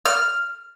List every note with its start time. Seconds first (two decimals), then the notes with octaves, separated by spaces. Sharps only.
0.06 F6